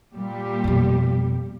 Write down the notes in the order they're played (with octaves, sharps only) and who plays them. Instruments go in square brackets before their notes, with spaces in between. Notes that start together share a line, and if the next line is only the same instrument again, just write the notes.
[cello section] A#2 G3 G4
[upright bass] F2 B2